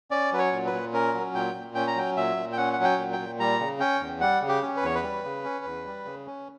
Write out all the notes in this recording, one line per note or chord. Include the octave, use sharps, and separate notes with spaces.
C#4 D5
F#3 B4
C#5
A#2
B4
A#2
C#4 A#4
F#3
A#2 G5
A#2
C#4 G5
A#5
F#3 G5
A#2 E5
A#2
G5
C#4 F#5
F#5
F#3
G5
A#2
G5
A#2
G3 A#5
C#3
C#4 G5
E2
G3 F#5
C#3
G4
C#4
B4
E2 C#5
B4
G3
C#3
C#4
E2
G3
C#3
C#4